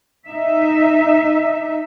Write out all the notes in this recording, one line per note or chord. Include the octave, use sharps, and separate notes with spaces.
D#4 E5